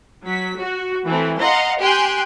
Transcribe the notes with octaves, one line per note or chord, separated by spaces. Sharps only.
F#3 B6
F#4
E3 A3 C4
D#5 F5 F#5 A#5 C6
G4 G5 G#5 C6 F#6 G6